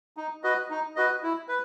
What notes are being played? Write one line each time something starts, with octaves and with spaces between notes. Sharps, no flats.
D#4
F#4 B4 D#5
D#4
F#4 B4 D#5
E4
B4